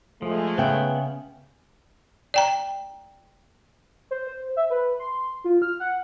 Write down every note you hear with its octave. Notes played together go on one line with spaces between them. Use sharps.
F3 G#3 A3
C#3 B3 E5 G5
D5 G5 A#5
C5
C5
E5
B4
C6
F4
F6
F#5